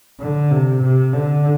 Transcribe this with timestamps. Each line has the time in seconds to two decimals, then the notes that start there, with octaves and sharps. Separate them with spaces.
0.20 D3
0.51 C3
0.82 C3
1.13 D3